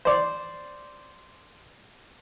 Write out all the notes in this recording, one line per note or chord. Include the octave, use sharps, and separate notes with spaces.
C5 D5